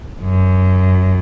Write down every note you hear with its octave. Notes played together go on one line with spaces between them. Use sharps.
F#2